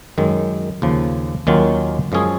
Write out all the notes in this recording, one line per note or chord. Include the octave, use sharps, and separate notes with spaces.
F#2 D#3 G#3
D#2 C#3 F3
D#2 D#3 F#3 C#4 F4
F#2 F3 G#3 C#4 G#4